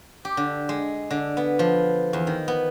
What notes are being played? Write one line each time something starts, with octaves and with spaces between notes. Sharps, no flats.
G4
D3
G#3
D3
B3
F3
E2
D#3
B3